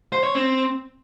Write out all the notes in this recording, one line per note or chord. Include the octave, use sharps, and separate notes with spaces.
C5
C#5
C4